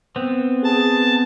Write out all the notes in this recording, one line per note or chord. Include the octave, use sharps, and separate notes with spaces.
B3 C4
G#4 A5